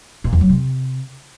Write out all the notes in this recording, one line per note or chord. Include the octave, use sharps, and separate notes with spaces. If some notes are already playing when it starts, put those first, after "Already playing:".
A#2
E2
F#3
C3